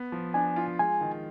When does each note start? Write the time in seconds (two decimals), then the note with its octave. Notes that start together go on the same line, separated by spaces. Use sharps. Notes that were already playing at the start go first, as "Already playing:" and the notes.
Already playing: B3
0.12 F3
0.34 D4 G#5
0.56 F4
0.79 G#3 G#5
1.01 D#3